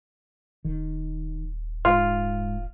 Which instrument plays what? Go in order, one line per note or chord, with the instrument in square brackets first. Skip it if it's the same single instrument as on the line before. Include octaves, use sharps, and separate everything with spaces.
[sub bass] D#1 [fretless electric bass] D#3
[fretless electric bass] G#2 [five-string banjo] F4